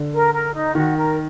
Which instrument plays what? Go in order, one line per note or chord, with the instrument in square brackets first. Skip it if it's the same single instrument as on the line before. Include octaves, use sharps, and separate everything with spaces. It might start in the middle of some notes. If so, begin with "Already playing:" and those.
Already playing: [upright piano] D3
[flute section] A#4
A#4
D#4
[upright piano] D#3 [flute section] F#4
[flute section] A#4